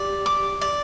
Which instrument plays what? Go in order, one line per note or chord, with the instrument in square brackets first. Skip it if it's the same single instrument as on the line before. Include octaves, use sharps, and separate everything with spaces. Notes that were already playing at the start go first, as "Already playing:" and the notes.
Already playing: [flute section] G4 [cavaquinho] D5
[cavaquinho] D6
D5